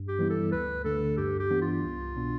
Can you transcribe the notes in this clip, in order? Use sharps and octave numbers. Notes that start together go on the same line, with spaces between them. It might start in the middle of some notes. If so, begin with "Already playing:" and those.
Already playing: G2
G4
E3 G3 B3 E4
A4
D2 B4
D3 A3 A4
G2 G4
G4
E3 B3 D4
F4
C2
B2 B3 D4